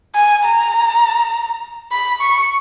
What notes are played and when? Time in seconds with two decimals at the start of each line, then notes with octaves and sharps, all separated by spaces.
0.15 G#5
0.45 A#5
1.92 B5
2.21 C#6